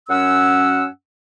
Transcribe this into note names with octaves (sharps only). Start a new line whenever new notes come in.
F#2 C#4 F#5 E6